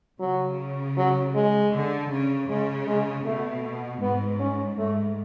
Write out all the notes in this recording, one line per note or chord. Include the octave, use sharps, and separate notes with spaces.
C#3 F#3
F#3
G#3
D3
C#3
C#3 G#3
G#3
B2 A3
G#2 B3
C#4
G#2 A3